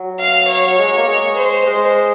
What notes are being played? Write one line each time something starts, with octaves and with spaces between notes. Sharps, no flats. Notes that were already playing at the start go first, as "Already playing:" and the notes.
Already playing: F#3
F5
C#5
F#3
G#3
A#3
G#3
C5
G#3